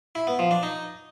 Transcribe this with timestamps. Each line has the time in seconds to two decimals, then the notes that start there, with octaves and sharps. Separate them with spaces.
0.15 E4
0.27 B3
0.39 F3
0.51 D4
0.63 D#4